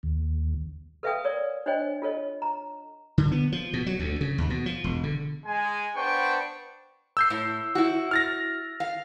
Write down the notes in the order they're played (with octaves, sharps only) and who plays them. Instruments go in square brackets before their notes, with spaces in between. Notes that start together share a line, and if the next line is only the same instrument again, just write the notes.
[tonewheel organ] D#2
[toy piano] A4 B4 E5 F5 G5 D#6
A#4 C#5 D5
D4 C5 C#5 D#5 G5
F4 A4 C#5 D#5
A#5
[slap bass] D3
B3
F3
B2
F#3
D2
C#3
D#2
B2
F3
E1
D3
[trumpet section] G#3 G#5
B3 D4 C5 G5 C#6
[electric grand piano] E6 G6 C7
[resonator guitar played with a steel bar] A2
E4 F#4
[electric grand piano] F6 A6 A#6
[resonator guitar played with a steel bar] F5